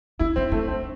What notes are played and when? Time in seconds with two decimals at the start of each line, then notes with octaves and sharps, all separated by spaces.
0.19 D4 E4
0.36 C4 D4
0.52 A3 D4
0.68 C4